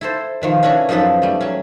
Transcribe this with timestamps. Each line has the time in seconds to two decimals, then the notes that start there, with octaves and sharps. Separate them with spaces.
0.01 E4 A4 C5
0.42 B2 D#3 F3
0.63 C#4 D4 E4 F#4 B4 C#5
0.89 F#2 F3 D#4 A4 B4
1.22 G3 A3
1.41 F#3 C#4